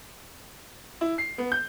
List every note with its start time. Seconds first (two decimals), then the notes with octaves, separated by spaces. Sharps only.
1.01 E4
1.18 C7
1.38 B3
1.52 G6